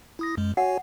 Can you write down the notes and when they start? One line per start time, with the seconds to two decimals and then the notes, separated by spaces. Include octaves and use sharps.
0.19 E4 D#6 A#6
0.37 F#2 G#3
0.57 F#4 C#5 F#5 G#5